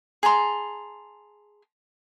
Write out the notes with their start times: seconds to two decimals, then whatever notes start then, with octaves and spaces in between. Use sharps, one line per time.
0.23 G#4 A5 A#5 C6